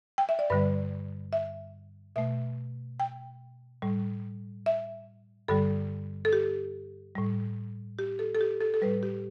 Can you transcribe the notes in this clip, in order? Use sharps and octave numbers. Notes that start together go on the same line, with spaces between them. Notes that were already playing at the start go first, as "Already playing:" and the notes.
G5
E5
D5
G2 D3 G3 B4
E5
B2 A3 E5
G5
A2 G3
E5
G2 D3 G3 A4
A4
G4
A2 G3
G4
A4
A4
G4
A4
A4
A2 G3 B4
G4